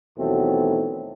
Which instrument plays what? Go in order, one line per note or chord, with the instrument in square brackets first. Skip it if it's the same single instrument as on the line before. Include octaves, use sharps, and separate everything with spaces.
[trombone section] D#2 B2 E3 F#3 A3 C4